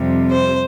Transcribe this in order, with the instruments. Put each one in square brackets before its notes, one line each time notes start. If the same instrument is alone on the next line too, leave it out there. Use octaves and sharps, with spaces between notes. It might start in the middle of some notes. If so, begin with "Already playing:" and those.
Already playing: [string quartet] F2 C3 G3
C5